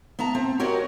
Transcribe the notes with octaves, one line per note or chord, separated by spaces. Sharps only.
B3 E5 A5 A#5
C4
F#4 G4 A#4 C#5 D#5